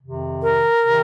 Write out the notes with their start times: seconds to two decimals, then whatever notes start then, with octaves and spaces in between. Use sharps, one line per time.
0.02 F2 C3 D#3
0.43 A#4
0.84 C3 D#3